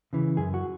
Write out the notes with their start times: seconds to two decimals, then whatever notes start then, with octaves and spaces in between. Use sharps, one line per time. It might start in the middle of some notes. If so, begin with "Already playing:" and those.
0.13 C#3 E3
0.37 F#2 G#4
0.54 F#4